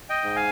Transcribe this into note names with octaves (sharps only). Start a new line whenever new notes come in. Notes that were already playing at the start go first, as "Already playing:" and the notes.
D#5 G5
G#2
F5 G#5